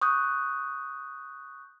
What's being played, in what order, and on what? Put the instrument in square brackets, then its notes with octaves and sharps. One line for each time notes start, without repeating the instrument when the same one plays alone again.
[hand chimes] C#6 D#6 F#6 G6